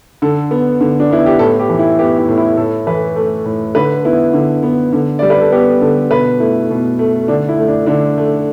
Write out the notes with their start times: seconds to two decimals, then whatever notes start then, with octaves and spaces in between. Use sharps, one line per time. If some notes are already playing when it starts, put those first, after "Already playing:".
0.22 D3 A4
0.51 B3
0.81 D3
1.00 D4
1.10 B3 E4
1.26 G4
1.39 A2 A4
1.60 G4
1.70 E3
1.79 E4
1.99 B3 G4
2.18 E4
2.29 A2
2.37 E4
2.57 A2 A4
2.87 E3 B4
3.16 A3
3.46 A2
3.75 D3 B4
4.05 B3 E4
4.34 D3
4.63 B3
4.93 D3
5.19 G3 D5
5.30 B4
5.41 A4
5.52 B3 G4
5.81 D3 A4
6.10 B2 B4
6.40 A3 E4
6.70 B2
6.99 A3
7.28 D3 D4
7.49 E4
7.59 A3
7.68 D4
7.86 D3 D4
8.18 A3